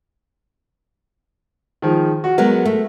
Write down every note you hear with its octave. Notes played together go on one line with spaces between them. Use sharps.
D#3 F3 G#3
F#4
F#3 G#3 B3 A#4
A3